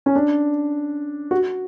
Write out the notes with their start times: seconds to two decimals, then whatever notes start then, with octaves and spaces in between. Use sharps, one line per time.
0.06 C#4
0.16 D4
1.31 F#4